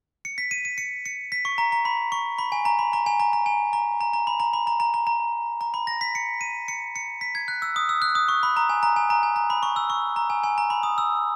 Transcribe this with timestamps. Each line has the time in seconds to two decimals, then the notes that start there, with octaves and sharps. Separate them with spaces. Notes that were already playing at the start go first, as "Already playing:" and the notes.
0.25 C#7
0.38 B6
0.51 D#7
0.65 D#7
0.78 C#7
1.06 C#7
1.32 B6
1.45 C#6
1.58 A#5
1.72 A#5
1.85 B5
2.12 C#6
2.39 B5
2.52 G#5
2.65 A#5
2.79 B5
2.93 A#5
3.06 G#5
3.20 A#5
3.33 A#5
3.46 G#5
3.73 A#5
4.01 A#5
4.13 A#5
4.27 B5
4.40 A#5
4.53 B5
4.67 A#5
4.80 A#5
4.94 A#5
5.07 A#5
5.61 A#5
5.74 B5
5.87 A#6
6.01 B6
6.15 C#7
6.41 D#7
6.68 C#7
6.96 C#7
7.21 B6
7.35 G#6
7.48 F#6
7.62 E6
7.76 D#6
7.89 E6
8.02 F#6
8.15 D#6
8.29 C#6
8.43 B5
8.57 A#5
8.69 G#5
8.83 A#5
8.96 G#5
9.10 A#5
9.23 G#5
9.36 A#5
9.50 B5
9.63 C#6
9.76 E6
9.90 C#6
10.16 A#5
10.30 G#5
10.44 G#5
10.58 A#5
10.70 B5
10.83 D#6
10.98 E6